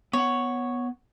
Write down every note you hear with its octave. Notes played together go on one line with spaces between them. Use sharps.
B3 C#5 F#5